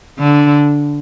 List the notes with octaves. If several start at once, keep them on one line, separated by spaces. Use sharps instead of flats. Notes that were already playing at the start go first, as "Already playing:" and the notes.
D3